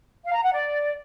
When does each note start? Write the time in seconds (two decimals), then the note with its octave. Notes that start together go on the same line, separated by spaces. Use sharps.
0.25 F5
0.34 A#5
0.43 F#5
0.52 D5